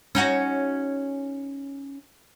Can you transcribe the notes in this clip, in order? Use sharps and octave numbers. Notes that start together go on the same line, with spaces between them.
C#4 D#4 F#4